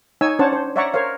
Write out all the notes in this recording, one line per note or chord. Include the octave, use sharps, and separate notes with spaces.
D#4 C#5 G#5 E6
C#4 D4 C5 C#5 F#5 A5
C5
C#5 D5 E5 F#5 A#5 C#6
A#4 C5 C#5 F5